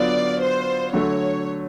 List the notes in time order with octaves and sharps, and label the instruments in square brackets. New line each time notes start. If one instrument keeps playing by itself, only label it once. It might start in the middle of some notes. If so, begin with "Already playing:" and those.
Already playing: [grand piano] D3 F#3 B3 D4 F4 [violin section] D5
[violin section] C5
[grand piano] D3 F#3 A3 [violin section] C#5